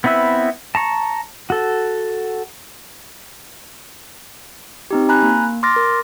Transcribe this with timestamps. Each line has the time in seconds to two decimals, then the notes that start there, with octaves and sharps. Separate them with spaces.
0.04 B3 C4 E4 B4 E5
0.75 A5 A#5 C#6
1.50 F#4 A4
4.91 C4 D#4 G4
5.09 G#5 A#5 B5 F#6
5.23 A#3
5.63 C6 D6 F6 A6 A#6
5.76 A#4